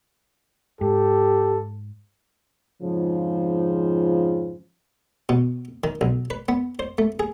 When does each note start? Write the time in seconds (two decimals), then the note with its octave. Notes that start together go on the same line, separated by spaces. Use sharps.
0.81 G#2 G4 A4
2.83 F2 G#2 C#3 F3
5.29 B2
5.84 D#3
6.01 B1
6.30 B4
6.48 B3
6.79 C5
6.98 A3
7.20 G#4